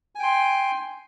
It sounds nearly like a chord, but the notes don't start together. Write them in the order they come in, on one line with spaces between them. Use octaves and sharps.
G#5 G5 C6